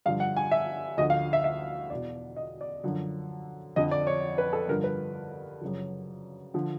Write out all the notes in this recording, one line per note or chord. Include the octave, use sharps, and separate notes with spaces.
G2 D3 F3 F5
F#5
G#5
E5
D2 D3 F3 D#5
F5
E5
E5
E2 B2 D5
D#5
D5
F#2 D3 F3
F2 D3 F3 D#5
D5
C#5
B4
A4
G2 D3 F3 A#4
B4
F#2 C#3 F3
D3 F3